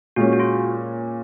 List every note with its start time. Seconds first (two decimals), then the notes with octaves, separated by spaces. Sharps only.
0.16 A#2 G#3 C#4 F#4
0.33 F#4
0.40 F4